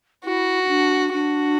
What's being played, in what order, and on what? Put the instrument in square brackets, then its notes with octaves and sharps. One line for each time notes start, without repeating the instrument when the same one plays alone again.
[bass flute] E4 [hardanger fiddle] F#4
[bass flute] E4
D4
[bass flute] D4 [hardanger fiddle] F#4